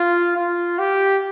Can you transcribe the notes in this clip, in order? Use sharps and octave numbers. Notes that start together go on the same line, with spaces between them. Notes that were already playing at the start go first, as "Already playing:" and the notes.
Already playing: F4
F4
G4